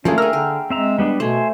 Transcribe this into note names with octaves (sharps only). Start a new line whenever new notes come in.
F3 A3 A#3 C#4 D4 G#4
G#4 A#4 G5 A#5 E6 F6
D3 A#4
G#3 C4 E5 A#5
G3 B3 D4
B2 A3 C5 G#5